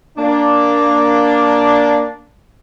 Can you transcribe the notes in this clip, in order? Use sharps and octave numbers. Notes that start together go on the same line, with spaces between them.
A#3 D4